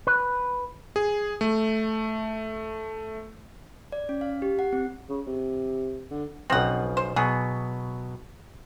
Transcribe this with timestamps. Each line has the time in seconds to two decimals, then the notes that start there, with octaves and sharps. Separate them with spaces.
0.07 B4
0.96 G#4
1.41 A3
3.92 D5
4.09 C#4
4.21 F5
4.42 G4
4.59 F#5
4.73 C4
5.09 C#3
5.27 C3
6.11 D3
6.50 B1 C#3 F3 C4 F#5
6.97 C5
7.16 B2 F#3 B3 G#4